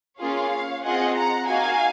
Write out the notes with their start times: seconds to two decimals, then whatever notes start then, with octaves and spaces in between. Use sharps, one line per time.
0.20 A#3 C#4 F4 G#4 C#5 F5
0.84 C4 F4 G#4 D#5 F#5
1.16 F#5 A#5
1.48 A#3 D#4 F#4 F5 G#5